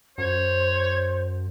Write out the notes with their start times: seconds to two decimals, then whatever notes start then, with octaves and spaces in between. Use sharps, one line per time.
0.18 F#2 C5 C#5